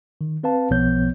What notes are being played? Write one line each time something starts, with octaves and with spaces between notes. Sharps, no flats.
D#3
C4 B4 F5 A5
B1 B2 F3 B3 C#5 G6